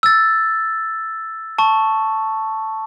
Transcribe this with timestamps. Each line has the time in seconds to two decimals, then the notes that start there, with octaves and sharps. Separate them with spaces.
0.03 E6 A6
1.59 A5 C#6